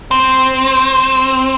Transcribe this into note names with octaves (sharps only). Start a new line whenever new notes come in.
C4